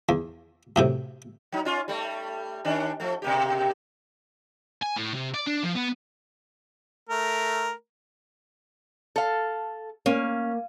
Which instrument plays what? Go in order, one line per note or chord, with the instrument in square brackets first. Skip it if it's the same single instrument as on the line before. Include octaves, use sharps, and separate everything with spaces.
[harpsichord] E2
F#2 A2 C3
[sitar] F#3 D#4
C#4 F4
G3 A3
D#3 C#4 D4
F3 A3
B2 A#3 G4
[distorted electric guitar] G#5
A2
C3
D5
D4
F3
B3
[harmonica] A3 A#4
[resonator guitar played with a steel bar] A4 F5
[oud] A#3 [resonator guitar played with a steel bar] C#4